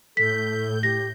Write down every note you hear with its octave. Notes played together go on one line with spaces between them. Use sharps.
A2 A4 G6 B6
G4 A#6